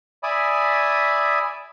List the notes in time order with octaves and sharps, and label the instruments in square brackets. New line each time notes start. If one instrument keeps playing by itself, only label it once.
[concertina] D5 E5 G#5 B5 D#6